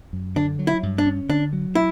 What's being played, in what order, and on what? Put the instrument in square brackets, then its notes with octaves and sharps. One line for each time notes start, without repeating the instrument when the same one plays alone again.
[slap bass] F#2
[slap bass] D3 [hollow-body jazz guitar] D4
[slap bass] F#3
[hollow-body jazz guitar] E4
[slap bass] G2
[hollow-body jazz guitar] D4
[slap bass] C#4
[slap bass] D3 [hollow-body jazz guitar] D4
[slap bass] F#3
[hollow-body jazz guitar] E4